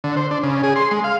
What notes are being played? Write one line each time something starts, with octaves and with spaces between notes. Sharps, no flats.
D3
C5
D4
C#3
G#4
C6
G#3
F5